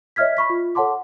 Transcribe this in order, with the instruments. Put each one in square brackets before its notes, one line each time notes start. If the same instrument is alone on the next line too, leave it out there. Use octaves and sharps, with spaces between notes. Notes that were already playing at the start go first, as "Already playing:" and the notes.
[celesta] C#5 D#5 E5 F6 G#6 B6
B5 C#6 B6
F4
A4 C#5 F#5 A5 C6 D6